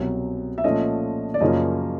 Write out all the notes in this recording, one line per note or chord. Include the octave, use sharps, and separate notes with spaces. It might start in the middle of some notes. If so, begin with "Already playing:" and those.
Already playing: C2 B2 F#3
E5
A#2 F3 A3 C#4 D#5
D5
F#2 C#3 F3 A#3 C#4 D#5